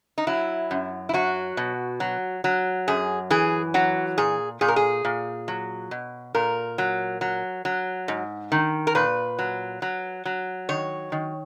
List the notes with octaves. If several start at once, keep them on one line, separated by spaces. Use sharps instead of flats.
D#4
F#3 E4
F#2
E4
F#3 F#4
B2
F#3
F#3
F#2 G#4
E3 G#4
F#3 F#4
A#2 G#4
A#2 G#4
A#4
G#4
A#2
F#3
B2
A#2 A#4
F#3
F#3
F#3
G#2
D#3
A#4
A#2 B4
F#3
F#3
F#3
D#3 C#5
D#3